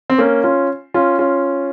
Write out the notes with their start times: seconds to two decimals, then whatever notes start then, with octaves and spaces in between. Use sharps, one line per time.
0.10 C4
0.18 A#3 C#4
0.44 C#4 F4
0.94 C#4 F4
1.19 C#4 F4